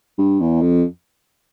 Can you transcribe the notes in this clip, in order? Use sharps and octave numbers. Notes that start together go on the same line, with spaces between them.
G2
E2
F2